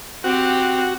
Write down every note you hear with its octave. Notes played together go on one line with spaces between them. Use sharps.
C4 F#4 G4